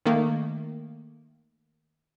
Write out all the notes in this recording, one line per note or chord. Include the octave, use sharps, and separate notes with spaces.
D#3 A3 A#3